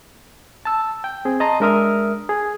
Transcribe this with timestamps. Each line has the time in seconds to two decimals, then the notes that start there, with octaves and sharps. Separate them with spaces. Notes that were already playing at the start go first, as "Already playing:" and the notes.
0.65 A5 E6
1.04 G5
1.25 C4 G#4
1.40 D#5 A5 A#5 C6 D#6
1.60 G#3 D4 A#4 E5 D#6 F6
2.29 G#4